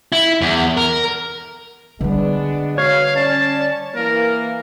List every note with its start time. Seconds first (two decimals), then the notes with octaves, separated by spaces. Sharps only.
0.12 E4
0.41 E2
0.77 A#4
2.01 D3 G3 G#3 B3 D4
2.78 B2 C#5 F5
3.16 C#4 D5 A5
3.95 E3 A#3 A#4